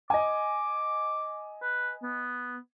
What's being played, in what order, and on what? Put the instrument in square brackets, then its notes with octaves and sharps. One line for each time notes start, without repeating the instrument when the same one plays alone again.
[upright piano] D#5 G#5 [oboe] D6
[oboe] B4
B3